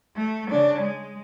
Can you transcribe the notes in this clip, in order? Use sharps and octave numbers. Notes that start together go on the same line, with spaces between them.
A3
C#3 D4
G#3